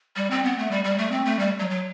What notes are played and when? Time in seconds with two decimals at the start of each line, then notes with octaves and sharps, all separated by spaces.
0.16 G3
0.31 C4
0.44 B3
0.58 A3
0.71 G3
0.84 G3
0.98 A3
1.11 C4
1.25 A3
1.39 G3
1.59 F#3
1.70 F#3